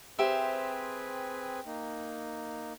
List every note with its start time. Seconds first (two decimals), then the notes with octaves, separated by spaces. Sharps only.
0.19 C4 G4 G#4 B4 C5 E5
1.66 A#3 D#4